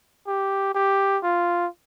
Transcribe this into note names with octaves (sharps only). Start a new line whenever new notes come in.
G4
G4
F4